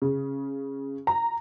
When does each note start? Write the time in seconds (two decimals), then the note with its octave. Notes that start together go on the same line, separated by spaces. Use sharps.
0.02 C#3
1.07 A#5